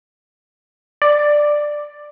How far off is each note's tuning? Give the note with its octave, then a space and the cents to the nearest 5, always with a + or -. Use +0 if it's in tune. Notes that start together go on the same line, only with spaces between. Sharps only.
D5 +10